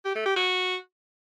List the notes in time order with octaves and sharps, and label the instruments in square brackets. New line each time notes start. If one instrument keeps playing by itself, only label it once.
[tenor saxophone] G4
A3
G4
F#4